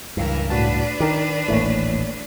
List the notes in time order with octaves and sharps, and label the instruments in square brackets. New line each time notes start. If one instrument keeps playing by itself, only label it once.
[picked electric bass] C#2 G2 [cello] E3 A#4
[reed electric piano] A2 F#4 A5 [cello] D4 B4
[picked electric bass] D#3 [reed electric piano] D#4 A#4 D5
[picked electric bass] D#1 A1 E3 [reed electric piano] A3 A#3 C#5